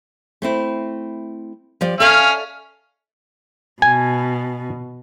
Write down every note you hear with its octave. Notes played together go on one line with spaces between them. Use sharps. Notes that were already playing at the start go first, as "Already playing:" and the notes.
A3 C4 E4
F3 G4 D5
C#4 A4 D5 E5 F5
B2 G#5